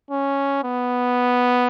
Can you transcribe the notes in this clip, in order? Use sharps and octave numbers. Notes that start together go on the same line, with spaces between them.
C#4
B3